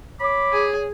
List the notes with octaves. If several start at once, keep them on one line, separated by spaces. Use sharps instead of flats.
C#5 B5 D6
G#4